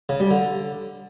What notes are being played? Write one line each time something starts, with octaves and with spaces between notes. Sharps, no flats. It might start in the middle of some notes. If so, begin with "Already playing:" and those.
C#3
G3
D3